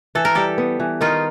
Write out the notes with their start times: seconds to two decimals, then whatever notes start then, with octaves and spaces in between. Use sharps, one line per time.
0.15 E3 A4
0.25 A#4
0.35 G3 G4 A4
0.58 B3
0.80 E3
1.01 D#3 D#4 F4